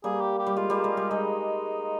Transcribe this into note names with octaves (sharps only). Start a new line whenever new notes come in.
G3 A#3 G#4
G4
G4
G3
G#3 F4
G3 A#3
G#3
G3
G#3 D#4